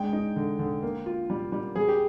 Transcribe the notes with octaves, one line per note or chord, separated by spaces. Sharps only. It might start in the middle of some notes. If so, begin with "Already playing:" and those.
Already playing: G#3 D4 G5
D#4
D3
D3
A#3
F4
G3
G3
G3 G#4
G4